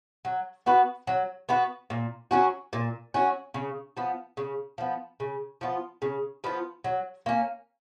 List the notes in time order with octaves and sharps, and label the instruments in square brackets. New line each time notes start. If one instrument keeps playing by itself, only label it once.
[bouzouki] F#3
B3 F#4 B4
F#3
B3 F#4 B4
A#2
F#3 C#4 F#4
A#2
F#3 C#4 F#4
C#3
F3 B3
C#3
F3 B3
C#3
F3 B3 F4
C#3
F3 B3 F4
F#3
A#3 C#4